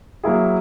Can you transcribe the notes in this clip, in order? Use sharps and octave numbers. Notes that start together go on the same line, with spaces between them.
F#3 A#3 E4 G#4